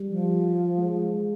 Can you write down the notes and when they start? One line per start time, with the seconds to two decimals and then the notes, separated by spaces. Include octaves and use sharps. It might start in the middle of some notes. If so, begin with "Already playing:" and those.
Already playing: G3
0.10 F3
0.78 G#3